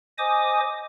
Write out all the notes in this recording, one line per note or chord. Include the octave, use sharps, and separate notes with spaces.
C5 D#5 G#5 D6 D#6